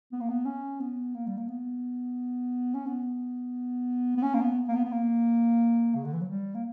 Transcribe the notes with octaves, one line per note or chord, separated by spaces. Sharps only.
B3
A#3
B3
C#4
B3
A#3
G3
A#3
B3
C#4
B3
B3
C#4
A#3
B3
A#3
B3
B3
A#3
C#3
D3
E3
F#3
G3
A#3